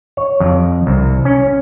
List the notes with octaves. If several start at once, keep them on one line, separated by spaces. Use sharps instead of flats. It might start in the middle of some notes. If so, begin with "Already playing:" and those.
C#5
F2
C2
C#4